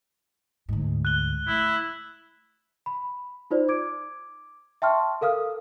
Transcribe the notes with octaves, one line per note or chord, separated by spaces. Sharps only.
D2 G#2
F#6 G7
A3 E4 E6
B5
D#4 F4 C5 D5
D6 G#6 D7
E5 G5 A5 C6 C#6 F6
A4 A#4 F5 D#6 F6